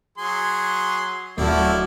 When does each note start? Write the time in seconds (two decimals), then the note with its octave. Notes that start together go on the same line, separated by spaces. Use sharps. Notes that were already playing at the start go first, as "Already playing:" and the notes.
0.18 F#3 G#4 C6
1.38 D1 F3 A3 E4 F#4 D5